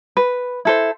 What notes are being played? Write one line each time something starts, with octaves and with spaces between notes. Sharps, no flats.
B4
E4 A4 C5